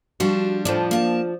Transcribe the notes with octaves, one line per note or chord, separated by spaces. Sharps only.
F3 G3 D4 F#4
F2 A2 F3 D4
A#3 A5